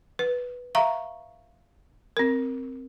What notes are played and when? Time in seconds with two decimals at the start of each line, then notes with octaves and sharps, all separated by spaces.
0.19 B4
0.75 E5 F5 A#5 C#6
2.17 C4 A#4